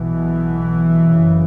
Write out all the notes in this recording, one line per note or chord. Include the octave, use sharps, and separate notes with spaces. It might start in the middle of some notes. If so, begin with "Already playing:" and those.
Already playing: B1 B2 E3
F#1 F#2 C#3